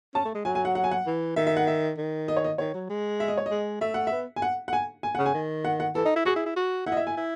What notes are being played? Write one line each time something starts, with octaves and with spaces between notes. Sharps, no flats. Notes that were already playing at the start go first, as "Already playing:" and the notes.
C#4 A5
A3
G#3
F#3 G#5
G#5
F#5
F#5
G#5
F#5
E3
D#3 E5
E5
F#5
E5
D#3
D#5
C#5
D#5
D#3 C#5
F#3
G#3
E5
D#5
C#5
G#3 D#5
A3 E5
F#5
B3 E5
G#5
F#5
F#5
G#5
G#5
C#3 F#5
G#5
D#3
F#5
F#5
E3 A4
D#4
E4
F#4 G#4
E4
E4
F#4
E4 F#5
D#5
E5
G#5
E4